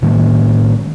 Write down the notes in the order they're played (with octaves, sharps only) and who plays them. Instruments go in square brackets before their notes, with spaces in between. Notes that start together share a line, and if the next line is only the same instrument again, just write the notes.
[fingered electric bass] A2 D#3 G#3 A#3